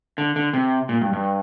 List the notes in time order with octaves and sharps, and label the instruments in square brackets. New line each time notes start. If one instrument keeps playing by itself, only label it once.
[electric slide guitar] D3
D3
C3
A#2
G2
G2